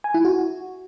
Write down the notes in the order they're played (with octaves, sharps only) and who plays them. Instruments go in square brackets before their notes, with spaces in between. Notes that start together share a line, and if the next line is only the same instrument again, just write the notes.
[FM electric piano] G#5
E4
F#4